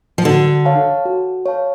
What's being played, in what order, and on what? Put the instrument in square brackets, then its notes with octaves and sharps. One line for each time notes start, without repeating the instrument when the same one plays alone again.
[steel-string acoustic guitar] F3
[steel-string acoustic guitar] D3 [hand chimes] F#4
[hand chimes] C#5 F5 A5
F#4
C#5 F5 A5